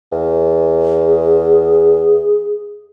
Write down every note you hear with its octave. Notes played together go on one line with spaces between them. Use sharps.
E2
G#4